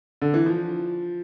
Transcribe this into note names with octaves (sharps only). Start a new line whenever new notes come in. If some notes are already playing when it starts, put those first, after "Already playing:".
D3
E3
F3